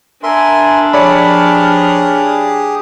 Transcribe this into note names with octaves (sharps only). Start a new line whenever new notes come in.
D4 A#4 E5 G#5 C6
F3 G4 G#4 C#5 D5 B5 D#6 F6